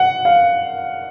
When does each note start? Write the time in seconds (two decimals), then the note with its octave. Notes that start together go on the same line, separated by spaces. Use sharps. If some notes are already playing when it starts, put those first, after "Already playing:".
Already playing: F#5
0.25 F5